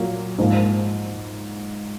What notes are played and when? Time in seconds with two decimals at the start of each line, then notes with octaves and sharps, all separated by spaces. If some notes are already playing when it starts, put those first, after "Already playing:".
Already playing: A#2 F#3 A#3
0.38 G#2 F3 A#3